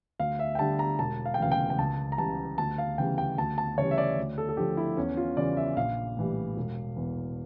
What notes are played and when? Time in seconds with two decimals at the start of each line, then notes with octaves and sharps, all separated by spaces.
0.19 D2 F5
0.39 E5
0.55 G5
0.59 D3 G3 A5
0.79 A#5
0.99 E1 A5
1.26 F5
1.34 G5
1.39 D2 C#3 E3 F5
1.52 G5
1.70 G5
1.78 C#2 A5
2.12 A#5
2.18 C#3 E3 G3 A5
2.58 D2 A5
2.78 F5
2.98 C#3 E3 G3 G5
3.18 G5
3.38 D2 A5
3.58 A5
3.78 C#3 E3 G3 C#5
3.91 E5
3.98 D5
4.17 D2
4.38 A4
4.49 A4
4.57 D3 F3 G4
4.77 E4
4.97 E2 C#4
5.17 F4
5.37 C#3 E3 G3 D5
5.57 E5
5.77 A#1 F5
6.17 A2 E3 G3
6.57 E1
6.96 E2 E3